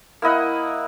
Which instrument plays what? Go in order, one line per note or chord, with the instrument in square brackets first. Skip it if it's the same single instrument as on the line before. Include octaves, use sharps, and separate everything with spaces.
[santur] A#3 E4 D#5 F#5